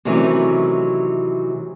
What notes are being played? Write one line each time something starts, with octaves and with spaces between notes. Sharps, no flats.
C3 D#3 E3 F#3 A3 C#4